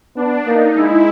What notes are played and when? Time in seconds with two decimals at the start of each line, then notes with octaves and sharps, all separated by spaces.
0.16 B3 D4
0.46 A#3 D#4
0.77 G#3 E4